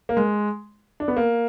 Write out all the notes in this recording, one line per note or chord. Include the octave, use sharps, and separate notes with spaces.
A#3
G#3
D4
B3
A#3